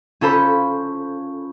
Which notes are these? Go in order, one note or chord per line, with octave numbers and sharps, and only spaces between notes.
C#4 F4 A4 C5 B5